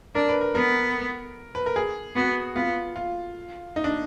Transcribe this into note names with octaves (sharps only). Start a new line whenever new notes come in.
D4 A#4
B4
A#4
B3 A#4
B4
A#4
G#4
B3 F#4
B3 F4
F4
D#4
D4